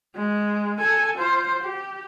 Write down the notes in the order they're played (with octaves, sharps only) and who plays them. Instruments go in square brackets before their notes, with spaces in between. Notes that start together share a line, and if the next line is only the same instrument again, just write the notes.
[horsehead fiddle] G#3
A4 G#5
F4 C5
G4